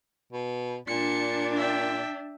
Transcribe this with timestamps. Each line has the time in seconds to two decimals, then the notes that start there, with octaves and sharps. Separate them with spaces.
0.32 B2
0.88 A#2 D4 C#7
1.56 E5 G5